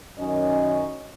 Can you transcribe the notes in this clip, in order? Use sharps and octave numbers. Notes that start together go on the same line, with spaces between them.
F#2 D#3 C#4 D#5